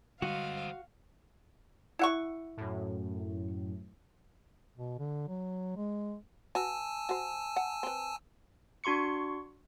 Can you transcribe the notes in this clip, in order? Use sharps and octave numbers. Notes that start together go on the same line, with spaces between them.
D3 G3 G#3 C4 F#4 D#5 F5
E4 F#5 C#6
F#2 A2
B2
D3
F#3
G#3
F#4 B4 G#5 A5 E6
F#4 C5
F#5
C4 B4
D4 F#4 C6 C#6 C#7